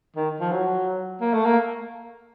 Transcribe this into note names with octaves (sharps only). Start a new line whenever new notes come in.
D#3
F3
F#3
A#3
A3
A#3